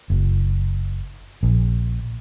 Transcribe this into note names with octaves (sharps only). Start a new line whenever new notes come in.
F#1
A#1